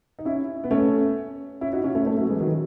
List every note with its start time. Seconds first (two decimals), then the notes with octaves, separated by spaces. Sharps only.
0.19 D#4
0.25 C#4 E4
0.64 B3
0.71 A3 C#4
1.61 C#4 E4
1.73 D#4 F#4
1.84 C#4 E4
1.95 A3 C#4
2.06 A3 C#4
2.18 F#3 A3
2.29 E3 G#3
2.40 D#3 F#3